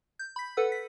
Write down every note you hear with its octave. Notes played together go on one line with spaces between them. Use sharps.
G6
B5 B6
A4 B4 F#5 E6
B6